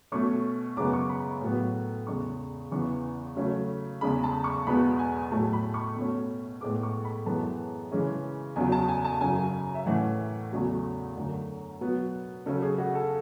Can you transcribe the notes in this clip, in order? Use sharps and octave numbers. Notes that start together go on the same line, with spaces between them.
B2 A3 C#4 C#6
F#2 C#3 G#3 B3 D6
C#6
B5
A2 F#3 B3
E2 C#3 G#3 C#6
E2 C#3 E3 B3 C#6
C#3 F#3 A3 C#4
E2 C#3 G#3 B5
A5
C#6
E2 B2 G#3 B3 B5
G#5
A2 F#3 A3 A5
B5
C#6
B2 A3 C#4
A2 G#3 B3 D6
C#6
B5
F#2 E3 G#3 B3 A5
C#3 E3 G#3 C#4
E2 C#3 F#3 G#5
A5
G#5
A5
F#2 C#3 F#3 G#5
E5
A2 E3 A3 C#4 F#5
E2 C#3 F#3 A3
F#2 D3 A3
B2 F#3 B3
C#3 F#3 C#4 A4
G#4
F#4
A4